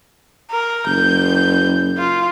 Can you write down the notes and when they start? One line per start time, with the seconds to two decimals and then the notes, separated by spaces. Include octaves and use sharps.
0.51 A#4
0.87 F#1 G6
1.98 F4